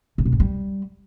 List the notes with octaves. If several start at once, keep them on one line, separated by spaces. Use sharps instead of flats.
C3
B2
G#2
G3